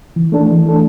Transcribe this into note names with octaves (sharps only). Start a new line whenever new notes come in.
E3
A3 D4 A4
E3
A3 D4 A4